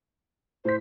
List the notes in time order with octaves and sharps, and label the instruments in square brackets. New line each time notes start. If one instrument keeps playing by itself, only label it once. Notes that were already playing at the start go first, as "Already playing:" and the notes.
[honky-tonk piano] A2 B6 [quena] C5